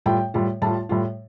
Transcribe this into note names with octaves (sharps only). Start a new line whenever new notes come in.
A2 G3 F4 G5
A2 G3 F4
A2 G3 F4 A5
A2 G3 F4